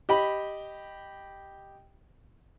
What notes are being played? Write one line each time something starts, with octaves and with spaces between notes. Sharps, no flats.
G4 D#5 G5 B5